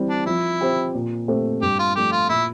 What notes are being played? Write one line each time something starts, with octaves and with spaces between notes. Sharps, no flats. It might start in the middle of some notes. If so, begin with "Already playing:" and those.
Already playing: E3 G3 C4
D4
F3 E4
C4 G4 C5
A#2
A3 C4 G4 C5
G2 G4
F4
F3 A3 D4 G4
F4
A#2 E4